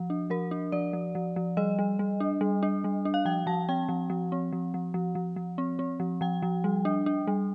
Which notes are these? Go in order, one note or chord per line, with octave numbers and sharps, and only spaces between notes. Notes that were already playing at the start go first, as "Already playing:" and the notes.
Already playing: F3
D4
F3 A#4
D4
F3 D5
F3
F3
F3
G3 D#5
G3
G3
D4
G3
D4
G3
D4
F5
F3 G5
F3 A5
C4 G5
F3
F3
C4
F3
F3
F3
F3
F3
C4
C4
F3
F3 G5
F3
G3
D4
D4
G3